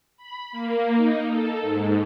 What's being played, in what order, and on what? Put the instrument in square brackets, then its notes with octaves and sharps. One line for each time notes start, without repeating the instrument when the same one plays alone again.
[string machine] B5
A#3
D#4
A4
G#2